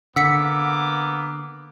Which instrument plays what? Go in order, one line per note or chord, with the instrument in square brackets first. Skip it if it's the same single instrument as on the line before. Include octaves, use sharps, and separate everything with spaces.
[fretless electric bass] D3 [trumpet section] A#3 B3 D6 [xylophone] F#5 B6 C#7 [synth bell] E6